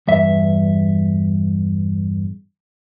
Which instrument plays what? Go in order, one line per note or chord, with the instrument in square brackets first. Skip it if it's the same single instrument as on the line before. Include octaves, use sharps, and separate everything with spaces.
[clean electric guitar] E2 G2 E5